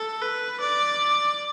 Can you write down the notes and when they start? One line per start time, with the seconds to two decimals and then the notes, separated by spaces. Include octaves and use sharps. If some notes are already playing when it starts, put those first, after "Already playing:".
Already playing: A4
0.22 B4
0.60 D5